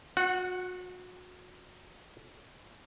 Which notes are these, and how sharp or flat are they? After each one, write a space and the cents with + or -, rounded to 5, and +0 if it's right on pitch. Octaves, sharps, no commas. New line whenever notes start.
F#4 -30 F#5 +0